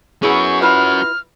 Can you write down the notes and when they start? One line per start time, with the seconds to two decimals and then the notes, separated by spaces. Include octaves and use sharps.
0.23 B3 C#4 E4 F#4 G#4 C#6
0.62 E4 F4 B4 F6